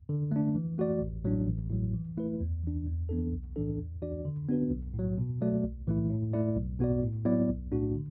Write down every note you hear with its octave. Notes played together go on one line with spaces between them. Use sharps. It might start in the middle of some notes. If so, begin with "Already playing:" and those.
D3
A3 D4
E3
A3 F#4 D5
A1
A2 F#3 D4
A1
A2 F#3
E3
A3 E4 B4
E2
E3 D4
E2
E3 B3 D4 A4
B1
A2 E3 D4 A4
E2
E3 D4 F#4 D5
D3
B3 D4 F#4 B4
B1
A2
F#3
B2
F#3 A3 F#4 D5
B1
A2 E3 A3 E4
A2
A3 E4 D5
B1
B2 B3 F#4 D5
A2
F#3 B3 E4 D5
B1
A2 A3 D4 F#4
D3